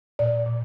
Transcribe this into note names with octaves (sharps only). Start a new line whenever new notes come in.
A#2 D5
A#2